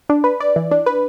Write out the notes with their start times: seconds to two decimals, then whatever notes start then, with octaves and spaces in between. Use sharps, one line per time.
0.09 D4
0.24 B4
0.40 D5
0.56 E3
0.71 D4
0.86 B4